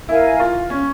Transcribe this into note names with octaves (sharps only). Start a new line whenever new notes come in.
E4 A#4 F5 G#5
F4
C#4